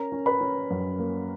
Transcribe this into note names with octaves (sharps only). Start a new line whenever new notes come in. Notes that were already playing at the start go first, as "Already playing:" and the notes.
Already playing: C#4 A#4 A#5
C#4
B4 B5
C#4
F#2
A#3